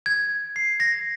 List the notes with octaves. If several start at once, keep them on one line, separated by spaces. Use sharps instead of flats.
G#6
C7
A#6